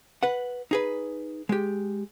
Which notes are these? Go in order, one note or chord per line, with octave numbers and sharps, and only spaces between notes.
B4 F#5
D#4 G#4 B4
G#3 G4